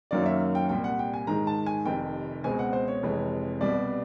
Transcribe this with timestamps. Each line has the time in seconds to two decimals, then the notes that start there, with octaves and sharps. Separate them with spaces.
0.11 F#2 D#3 F#3 A#3 C#4 D5
0.26 E5
0.55 G5
0.69 C2 A#2 G3 G5
0.84 F#5
0.99 G5
1.14 G#5
1.27 G#2 D#3 G#3 A#5
1.47 A5
1.66 G#5
1.86 F1 F2 C3 D#3 G5
2.44 C#2 B2 G#3 C4 G#5
2.59 F#5
2.73 C5
2.88 C#5
3.03 F1 F2 C3 E3 G#3
3.61 C2 B2 G3 B3 D5